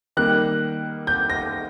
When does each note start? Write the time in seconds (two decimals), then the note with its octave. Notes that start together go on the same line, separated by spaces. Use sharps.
0.17 D#3 G3 A#3 F#6
1.07 G6
1.30 A#6